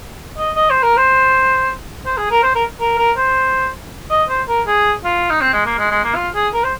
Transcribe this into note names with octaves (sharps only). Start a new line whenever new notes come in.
D#5
D#5
C5
A#4
C5
C5
G#4
A#4
C5
A#4
A#4
A#4
C5
D#5
C5
A#4
G#4
F4
D#4
C4
G#3
A#3
G#3
G#3
A#3
F4
G#4
A#4
C5